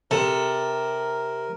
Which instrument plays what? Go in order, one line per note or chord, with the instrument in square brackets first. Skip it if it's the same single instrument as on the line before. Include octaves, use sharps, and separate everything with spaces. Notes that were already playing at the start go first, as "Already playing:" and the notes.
[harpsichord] C3 [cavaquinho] A4 [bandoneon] A#4